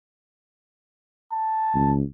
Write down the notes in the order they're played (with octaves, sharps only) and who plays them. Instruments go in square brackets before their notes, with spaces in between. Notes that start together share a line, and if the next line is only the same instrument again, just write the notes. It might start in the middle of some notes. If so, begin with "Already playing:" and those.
[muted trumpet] A5
[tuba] C#2